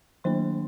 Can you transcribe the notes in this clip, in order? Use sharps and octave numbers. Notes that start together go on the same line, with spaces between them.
D#3 F#3 A#3 D4 C5 C6